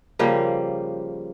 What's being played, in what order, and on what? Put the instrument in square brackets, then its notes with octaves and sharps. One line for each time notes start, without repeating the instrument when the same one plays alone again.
[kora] C#3 F3 G3 A#3